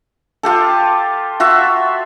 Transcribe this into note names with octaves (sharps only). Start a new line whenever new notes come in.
F4 G4 A4
F4 F#4 E5